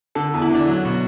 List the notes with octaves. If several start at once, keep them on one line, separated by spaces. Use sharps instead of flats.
D3 A4
E2
E4
D3 D4
F#3
B2